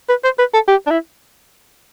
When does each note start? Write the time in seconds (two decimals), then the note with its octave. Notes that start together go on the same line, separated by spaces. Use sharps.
0.09 B4
0.24 C5
0.39 B4
0.54 A4
0.68 G4
0.86 D4
0.91 E4